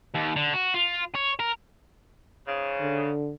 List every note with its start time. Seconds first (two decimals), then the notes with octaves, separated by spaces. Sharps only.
0.15 D#2
0.36 D3
0.53 F#4
0.74 F4
1.15 C#5
1.40 A#4
2.46 G#2 C#3
2.80 D3